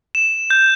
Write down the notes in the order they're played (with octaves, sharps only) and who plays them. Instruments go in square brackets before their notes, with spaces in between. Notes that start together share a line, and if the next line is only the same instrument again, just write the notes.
[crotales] E7
G6